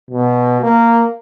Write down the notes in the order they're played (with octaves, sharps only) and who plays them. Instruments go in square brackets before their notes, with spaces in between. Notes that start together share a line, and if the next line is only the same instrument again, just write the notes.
[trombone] B2
A#3